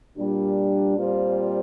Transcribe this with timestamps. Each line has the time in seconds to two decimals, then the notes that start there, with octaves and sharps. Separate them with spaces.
0.17 A#2 G3 D4
0.97 A#2 G3 C4 F4 C5